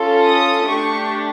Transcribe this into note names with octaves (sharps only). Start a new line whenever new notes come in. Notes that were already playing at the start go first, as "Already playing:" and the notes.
Already playing: C#4 F4 A4
D#6
A3 D4 G4 C#6